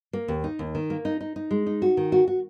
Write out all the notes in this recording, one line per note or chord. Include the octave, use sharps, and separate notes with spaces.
A#3
D#2
D#4
D#2
D#3
A#3
D#4
D#4
D#4
G#3
D#4
F#4
D#3
F#4
F#4